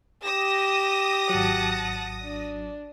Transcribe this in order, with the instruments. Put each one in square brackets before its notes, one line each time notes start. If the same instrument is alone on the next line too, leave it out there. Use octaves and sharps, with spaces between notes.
[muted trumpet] G4 [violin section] D#6 A#6 [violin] E7
[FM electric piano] G#1 F#3 [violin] F#5 A5
[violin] D4